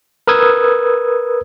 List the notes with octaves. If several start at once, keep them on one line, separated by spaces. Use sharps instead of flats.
A#4 B4 D#6 E6 G#6